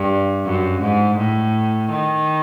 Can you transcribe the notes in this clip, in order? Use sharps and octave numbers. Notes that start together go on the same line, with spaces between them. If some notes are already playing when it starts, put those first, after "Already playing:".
Already playing: G2
F#2
G#2
A2
D#3